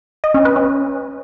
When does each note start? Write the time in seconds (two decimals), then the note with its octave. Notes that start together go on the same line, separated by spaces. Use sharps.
0.24 D#5
0.34 C#4
0.45 B4
0.56 C#4